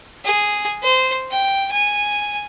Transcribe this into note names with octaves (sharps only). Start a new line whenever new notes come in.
G#4
C5
G5
G#5